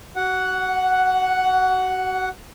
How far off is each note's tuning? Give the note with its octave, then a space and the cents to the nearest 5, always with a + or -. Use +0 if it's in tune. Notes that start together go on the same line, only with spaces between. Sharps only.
F#4 +30 F#5 +0